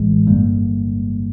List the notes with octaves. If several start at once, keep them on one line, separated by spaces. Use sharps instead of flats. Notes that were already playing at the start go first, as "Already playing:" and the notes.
Already playing: A#1 A2 E3 G#3
G1 G2 D3 G3 A#3